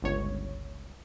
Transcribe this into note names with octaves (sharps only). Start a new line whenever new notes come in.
G1 C#2 C#5